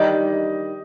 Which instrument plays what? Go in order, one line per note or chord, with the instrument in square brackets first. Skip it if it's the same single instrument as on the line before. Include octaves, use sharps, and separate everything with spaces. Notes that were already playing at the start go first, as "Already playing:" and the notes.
Already playing: [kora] D#3 G3 D4 G4 [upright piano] D#5